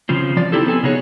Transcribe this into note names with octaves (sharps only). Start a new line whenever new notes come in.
C#3 F3 C4
F3 D5
C4 C#4 D#4 E4 G4 A4
B3 C4 A4 G#5
C#3 B3 D#4 F#4 G#4 C#5